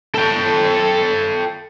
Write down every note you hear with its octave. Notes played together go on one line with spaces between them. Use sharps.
A4 G5